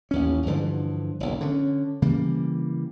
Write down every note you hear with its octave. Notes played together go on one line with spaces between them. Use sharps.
A1 D#2 C#4
G2 D3 E3 F3
F#1 B1
D3 E3 C#4
C#3 E3 G3 A#3